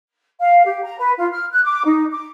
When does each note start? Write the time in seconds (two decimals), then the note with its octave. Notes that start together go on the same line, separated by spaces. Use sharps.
0.40 F5
0.65 G4
0.84 A#5
0.98 B4
1.18 F4
1.32 F6
1.51 F#6
1.64 D6
1.85 D#4
2.10 D6